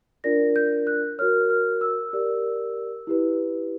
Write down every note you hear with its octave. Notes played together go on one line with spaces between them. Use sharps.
D4 F4 A#4 D5 A#6
G6
F#6
F#4 A#4 C#5 F6
F6
E6
G4 A#4 D5
E4 G4 B4